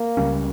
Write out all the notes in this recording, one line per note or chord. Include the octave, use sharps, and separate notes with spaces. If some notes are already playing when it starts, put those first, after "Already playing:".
Already playing: A#3
C#2 C#3 G3 C#4